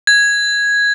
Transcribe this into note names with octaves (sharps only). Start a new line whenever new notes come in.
G#6